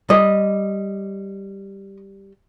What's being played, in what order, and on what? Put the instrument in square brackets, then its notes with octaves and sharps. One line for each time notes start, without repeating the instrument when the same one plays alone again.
[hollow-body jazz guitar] G3 [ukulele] D#5